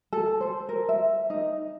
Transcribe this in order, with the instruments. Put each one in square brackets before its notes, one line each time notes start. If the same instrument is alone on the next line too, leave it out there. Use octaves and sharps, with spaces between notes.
[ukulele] A4
C5
A#4
E5
D#4